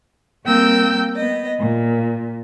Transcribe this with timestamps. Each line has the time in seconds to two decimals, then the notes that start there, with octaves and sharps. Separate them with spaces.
0.46 G3 A#3 C4 G5 E6 G6
1.16 B3 D#5
1.60 A#2